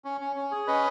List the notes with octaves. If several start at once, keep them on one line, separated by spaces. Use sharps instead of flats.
C#4
C#4
C#4
G#4
C#4 B4 D#5